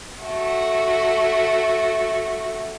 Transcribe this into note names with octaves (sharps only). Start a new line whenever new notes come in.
A3 F#4